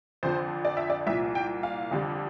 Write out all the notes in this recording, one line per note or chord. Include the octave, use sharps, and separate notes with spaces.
F2 D3 F3 C5
D5
E5
D5
C2 A#2 F3 E5
G5
F5
F2 D3 G3